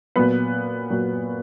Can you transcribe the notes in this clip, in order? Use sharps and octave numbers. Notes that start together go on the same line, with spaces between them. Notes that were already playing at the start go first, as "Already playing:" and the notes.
A#2 F#3 B3 B4
A#2 F#3